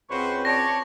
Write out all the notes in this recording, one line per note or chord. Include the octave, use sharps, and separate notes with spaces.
C#2 C4 F#4 B4 C5 C#6
C#5 D5 A5 A#6